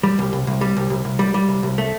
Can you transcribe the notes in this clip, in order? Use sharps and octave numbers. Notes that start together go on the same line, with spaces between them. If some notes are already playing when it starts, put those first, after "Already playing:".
G3
C2
C2
C2
G3
C2
C2
C2
G3
G3
C2
C2
A3